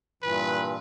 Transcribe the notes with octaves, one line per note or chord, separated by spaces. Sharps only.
G2 A#2 E3 B4